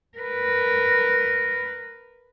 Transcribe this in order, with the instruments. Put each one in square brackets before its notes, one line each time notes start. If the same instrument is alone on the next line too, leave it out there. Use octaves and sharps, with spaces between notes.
[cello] A#4 B4